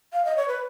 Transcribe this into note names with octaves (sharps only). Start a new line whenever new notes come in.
F5
D#5
C#5
B4